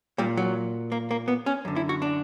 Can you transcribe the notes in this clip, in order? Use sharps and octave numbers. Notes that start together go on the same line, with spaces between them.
A#2 G3
F#3
A#3
A#3
B3
C#4
F#2 D3
E4
F#4
D4